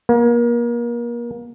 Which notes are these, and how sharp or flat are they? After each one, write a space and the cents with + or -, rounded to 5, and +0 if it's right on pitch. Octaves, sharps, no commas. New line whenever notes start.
A#3 +30